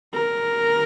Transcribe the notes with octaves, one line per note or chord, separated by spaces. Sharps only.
A#4